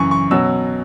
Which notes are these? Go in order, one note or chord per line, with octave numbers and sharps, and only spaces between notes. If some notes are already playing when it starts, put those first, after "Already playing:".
Already playing: F#2 C#3 E3 C#6
C#6
B2 F#3 C#4 E6